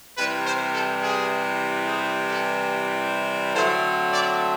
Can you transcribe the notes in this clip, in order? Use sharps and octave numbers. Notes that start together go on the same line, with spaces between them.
C3 E3 G3 B4
C5
A4
G#4
G#4
A4
D3 F#3 A3 C4 C5
D5